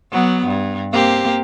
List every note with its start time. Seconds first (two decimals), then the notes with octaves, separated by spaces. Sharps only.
0.11 F#3 B3
0.47 G2
0.92 A#3 C4 G4